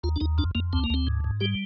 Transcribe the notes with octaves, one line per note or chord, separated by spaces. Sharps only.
D#2 F4
D4
D#2 D#4
F2 D4
F2 A#3
D2 C4
A#3
D2 C4
G#2
G#2
G3 G4